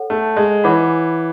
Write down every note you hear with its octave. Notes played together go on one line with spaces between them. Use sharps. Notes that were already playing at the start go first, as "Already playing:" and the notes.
Already playing: A4 C#5 F#5
A3
G#3
E3 C#5 F#5 B5 D6